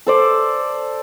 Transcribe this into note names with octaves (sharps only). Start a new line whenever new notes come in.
A4 C5 D5